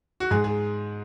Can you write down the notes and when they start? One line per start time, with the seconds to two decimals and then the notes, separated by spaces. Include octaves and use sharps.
0.20 F#4
0.31 G#2 G#4
0.44 G#4